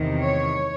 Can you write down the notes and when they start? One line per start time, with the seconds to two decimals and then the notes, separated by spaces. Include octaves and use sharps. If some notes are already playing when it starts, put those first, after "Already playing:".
Already playing: E2 C3 D#3
0.22 C#5